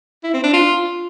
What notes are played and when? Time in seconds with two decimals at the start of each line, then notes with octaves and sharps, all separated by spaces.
0.24 E4
0.34 C4
0.44 D4
0.53 F4